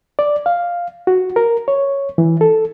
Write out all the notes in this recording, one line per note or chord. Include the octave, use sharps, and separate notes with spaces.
D5
F5
F#4
A#4
C#5
E3
A4